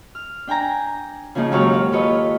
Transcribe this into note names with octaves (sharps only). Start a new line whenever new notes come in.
F6
D4 G5 G#5 A#5
C#3 F3 A#3 D#4 G#4
D#2 G#2 F#3 C#5 F5 C#6
F5
F4 A4 B4 C#5 D#5